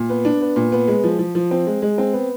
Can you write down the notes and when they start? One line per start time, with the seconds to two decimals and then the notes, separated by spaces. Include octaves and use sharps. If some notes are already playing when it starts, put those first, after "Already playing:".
Already playing: A#2
0.09 B3
0.25 D4
0.41 B3
0.56 A#2
0.72 B3
0.88 G#3
1.04 F3
1.19 F3
1.35 F3
1.51 C4
1.67 G#3
1.82 G#3
1.98 C4
2.13 B3